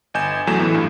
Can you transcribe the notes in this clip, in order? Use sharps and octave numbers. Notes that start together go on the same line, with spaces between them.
G1 D#5 G#5 G6 E7
A1 E2 F#3 A3 E7
A2 E3 B3
G2